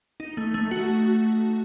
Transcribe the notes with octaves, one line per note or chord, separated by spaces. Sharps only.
D#4
A3
A3
F#4